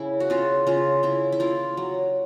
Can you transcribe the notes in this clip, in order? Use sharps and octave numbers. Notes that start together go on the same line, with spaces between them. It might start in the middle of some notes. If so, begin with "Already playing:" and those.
Already playing: C#3 E4
F#4
C#3 F4
C#3 F4
C#3 E4
E4
A#3 F4
F#3